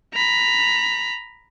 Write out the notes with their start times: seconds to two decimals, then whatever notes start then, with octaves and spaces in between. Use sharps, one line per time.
0.14 A#5 B5